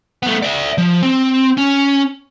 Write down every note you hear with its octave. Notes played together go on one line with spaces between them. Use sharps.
A3 B3
D5 E5
F3
C4
C#4